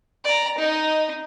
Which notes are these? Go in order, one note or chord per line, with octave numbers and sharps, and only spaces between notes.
D5 A#5
D#4 D#5